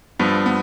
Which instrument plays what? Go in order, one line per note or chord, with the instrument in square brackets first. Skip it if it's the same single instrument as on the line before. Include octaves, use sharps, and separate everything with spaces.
[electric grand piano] G2 F3 B3
B3